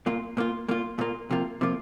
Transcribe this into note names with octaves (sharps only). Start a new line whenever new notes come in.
A#2 A#3 F4
A#2 A#3 F4
A#2 A#3 F4
A#2 A#3 F4
C3 F3 A#3 F4
C3 F3 A#3 F4